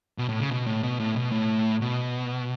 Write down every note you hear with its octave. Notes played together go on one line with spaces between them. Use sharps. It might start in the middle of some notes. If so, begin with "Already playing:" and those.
B2
A2
C#3
B2
A2
B2
A2
B2
A2
B2